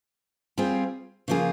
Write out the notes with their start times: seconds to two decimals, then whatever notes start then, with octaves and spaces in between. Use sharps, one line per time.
0.58 G3 C4 F4 G#4
1.28 C#3 F3 A#3 F4 G#4